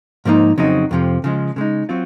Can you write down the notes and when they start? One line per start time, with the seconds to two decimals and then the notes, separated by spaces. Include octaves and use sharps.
0.25 G#2 F3 A#3 D#4
0.58 F2 C#3 F#3 C4 D#4
0.91 F2 C3 F3
1.24 C#3 F3 G#3
1.56 C#3 G#3 D#4
1.89 F#3 C4 F4